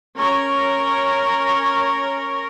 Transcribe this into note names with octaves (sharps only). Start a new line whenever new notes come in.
C#4 A#4 C#5